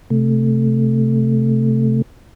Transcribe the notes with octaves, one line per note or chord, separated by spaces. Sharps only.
C3 A3